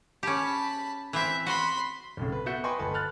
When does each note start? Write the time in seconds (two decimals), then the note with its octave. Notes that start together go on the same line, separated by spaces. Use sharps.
0.23 C#4 G4 A5 B5
1.13 E3 C4 E5
1.46 F#4 B5 C6
2.17 B1 A2 C#3
2.32 B4
2.46 B3 F#4 E5 G6 C#7
2.64 B4 D#5 G5 G#5 C6 C#6
2.80 G1 D2 B4 A5
2.94 B5 F6 F#6 A6